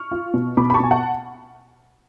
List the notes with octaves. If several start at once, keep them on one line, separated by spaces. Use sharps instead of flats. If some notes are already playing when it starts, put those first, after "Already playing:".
Already playing: C#6 F6
F4
B2
B2 B5 D6
B5
A5 C#6
B2 G#5
F#5 A5